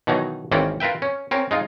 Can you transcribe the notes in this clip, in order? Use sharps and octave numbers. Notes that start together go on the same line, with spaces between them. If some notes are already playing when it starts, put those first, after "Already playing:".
B2 D#3 E3 F#3 D#4
G#1 E3 A#3 C4 C#4 D5
F4 A#4 B4 E5 G5
C#4
C4 C#4 A#4
G#3 D#4 F4